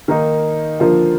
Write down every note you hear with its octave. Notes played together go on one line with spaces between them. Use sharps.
D#3 A#3 D#4
D3 F3 A#3 F4